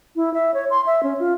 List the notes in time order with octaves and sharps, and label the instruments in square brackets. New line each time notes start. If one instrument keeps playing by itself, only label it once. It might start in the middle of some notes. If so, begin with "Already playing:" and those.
[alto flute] E4
E5
C#5
C6
E5
C#4
F4